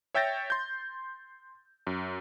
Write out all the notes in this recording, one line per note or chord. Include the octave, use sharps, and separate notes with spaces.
C#5 E5 G5 G6 A6 A#6
C6 G6
F#2